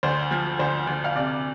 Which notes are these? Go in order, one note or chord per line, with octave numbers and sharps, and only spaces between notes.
D2 C5
F3
D2 C5
D2
F5
C3 D5